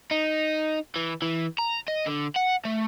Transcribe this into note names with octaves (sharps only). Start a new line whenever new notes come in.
D#4
E3
E3
A#5
D#5
D3
F#5
A3